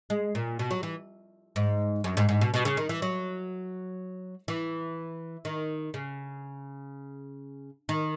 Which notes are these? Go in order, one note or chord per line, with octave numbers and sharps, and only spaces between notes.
G#3
A#2
B2
F#3
E3
G#2
F#2
G#2
G#2
B2
B2
C#3
D#3
E3
F#3
E3
D#3
C#3
D#3